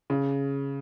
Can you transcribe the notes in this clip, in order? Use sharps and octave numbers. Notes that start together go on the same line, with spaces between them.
C#3